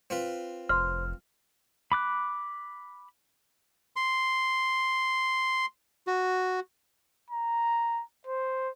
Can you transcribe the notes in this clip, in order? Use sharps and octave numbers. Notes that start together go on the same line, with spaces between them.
C4 F4 B4
F1 C5 F6
B5 D6 F#6
C6
F#4
A#5
C5